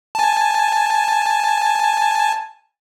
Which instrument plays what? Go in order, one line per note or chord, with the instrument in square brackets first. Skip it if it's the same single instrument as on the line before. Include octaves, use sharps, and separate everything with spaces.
[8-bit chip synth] G#5 A5